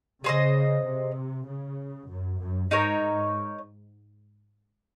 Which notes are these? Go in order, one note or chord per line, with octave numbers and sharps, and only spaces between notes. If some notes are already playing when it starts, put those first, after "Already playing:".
C#3 G#4 C5 D#5
C3
C#3
F#2
F#2
G#2 D#4 A#4 C#5